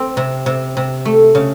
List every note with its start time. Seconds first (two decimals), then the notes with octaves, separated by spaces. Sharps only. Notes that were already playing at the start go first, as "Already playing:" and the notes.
Already playing: C4
0.17 C3
0.46 C3
0.77 C3
1.05 A3
1.35 C#3